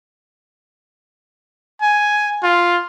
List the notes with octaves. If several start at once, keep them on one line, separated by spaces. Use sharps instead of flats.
G#5
F4